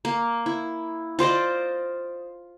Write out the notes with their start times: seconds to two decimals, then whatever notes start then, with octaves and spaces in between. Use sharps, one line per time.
0.05 A#3
0.46 E4
1.19 F4 C5 D5 D#5